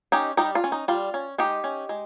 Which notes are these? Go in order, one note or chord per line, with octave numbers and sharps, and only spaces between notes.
C#4 D#4 G4
G3 D#4 G4
F4
C#4
D#4
G3 F4
C#4
G#3 D#4 G4
C#4
G#3